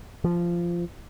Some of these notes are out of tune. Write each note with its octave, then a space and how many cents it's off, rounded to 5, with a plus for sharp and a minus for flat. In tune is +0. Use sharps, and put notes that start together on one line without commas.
F3 -15